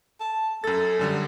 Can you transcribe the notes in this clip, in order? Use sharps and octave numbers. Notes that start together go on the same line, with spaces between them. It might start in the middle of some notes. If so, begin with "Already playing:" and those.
A5
F#2 A4 A6
F#2 D3 G3